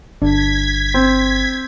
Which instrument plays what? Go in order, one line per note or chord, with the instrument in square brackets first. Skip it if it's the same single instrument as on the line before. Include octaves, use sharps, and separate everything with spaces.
[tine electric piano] G1 [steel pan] D4 [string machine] G#6 B6
[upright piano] C4